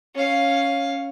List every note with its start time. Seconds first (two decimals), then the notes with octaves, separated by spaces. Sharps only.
0.15 C#4 F5